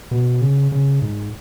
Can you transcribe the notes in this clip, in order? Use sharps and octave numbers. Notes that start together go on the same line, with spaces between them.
B2
C#3
C#3
G#2